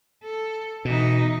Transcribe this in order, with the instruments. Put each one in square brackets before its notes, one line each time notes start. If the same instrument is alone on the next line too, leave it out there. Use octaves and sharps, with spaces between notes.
[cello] A4
[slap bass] B2 [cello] E3 D#4